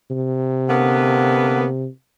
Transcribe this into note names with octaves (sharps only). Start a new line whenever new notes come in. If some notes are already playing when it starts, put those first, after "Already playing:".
C3
D3 A#3 B3